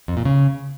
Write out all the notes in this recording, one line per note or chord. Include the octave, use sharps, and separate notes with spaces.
F2
A#2
C#3